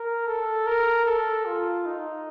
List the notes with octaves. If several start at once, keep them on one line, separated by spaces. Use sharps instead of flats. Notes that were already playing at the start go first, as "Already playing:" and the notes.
Already playing: A#4
A4
A#4
A4
F4
D#4